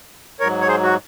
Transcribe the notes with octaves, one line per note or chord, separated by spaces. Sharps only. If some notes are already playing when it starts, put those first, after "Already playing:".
G#2 F#3 A#4 C#5
C#5
G#4 C5
F#4